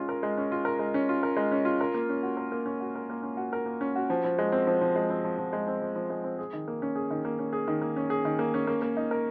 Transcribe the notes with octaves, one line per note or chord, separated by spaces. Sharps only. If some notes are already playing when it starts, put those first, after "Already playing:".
Already playing: G#3 C#4 F4
A#4
G#3
C#4
F4
A#4
G#3
C#4
F4
A#4
G#3
C#4
F4
A#4
A#3
C#4
F#4
A#4
A#3
C#4
F#4
A#4
A#3
C#4
F#4
A#4
A#3
C#4
F#4
F3
F3
G#3
C4
F3
F3
G#3
C4
F3
F3
G#3
C4
F3
F3
G#3
C4
G#4
D#3
A#3
C#4
G#4
D#3
A#3
C#4
G#4
D#3
A#3
C#4
G#4
D#3
A#3
C#4
A#3
A#3
D#4
A#4